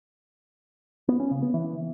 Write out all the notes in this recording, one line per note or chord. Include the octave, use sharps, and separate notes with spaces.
B3
C#4
C#3
B3
E3